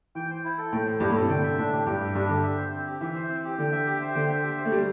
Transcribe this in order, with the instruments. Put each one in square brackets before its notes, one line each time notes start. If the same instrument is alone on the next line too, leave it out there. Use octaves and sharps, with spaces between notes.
[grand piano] E3 [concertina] G5
[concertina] C5
E4
A4
[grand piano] A2 [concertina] G5
[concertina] C5
[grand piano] G2 [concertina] E4
[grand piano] A2
[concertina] A4
[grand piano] C3
[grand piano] D3 [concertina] G5
[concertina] E5
[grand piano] A2 [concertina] D4
[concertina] G4
[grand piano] G2 [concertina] G5
[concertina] E5
[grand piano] G2 [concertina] D4
[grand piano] D3 [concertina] G4
[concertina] E5
C5
C4
G4
[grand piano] E3 [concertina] E5
[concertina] C5
C4
G4
[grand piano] D3 [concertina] G5
[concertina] E5
G4
C5
[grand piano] D3 [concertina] G5
[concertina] E5
G4
C5
[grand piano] A3
[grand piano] G3 [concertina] C5